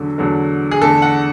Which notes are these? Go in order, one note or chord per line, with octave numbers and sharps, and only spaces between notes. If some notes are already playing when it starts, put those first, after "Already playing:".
Already playing: E2 D3 F#3 A3
E2 D3 F#3 A3
G#4
E2 D3 A3 A4
F#5